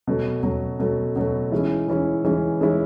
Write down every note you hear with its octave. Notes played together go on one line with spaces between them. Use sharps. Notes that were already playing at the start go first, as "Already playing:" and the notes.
B2 F#3 A3
B2 F#3 A3
B2 F#3 A3
B2 F#3 A3
E3 G#3 C#4 E4
E3 G#3 C#4 E4
E3 G#3 C#4 E4
E3 G#3 C#4 E4